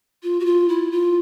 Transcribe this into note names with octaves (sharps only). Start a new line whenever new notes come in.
F4
F#4
F4
E4
F4